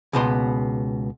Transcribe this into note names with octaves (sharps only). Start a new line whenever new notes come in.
C#2 B2 B3 C6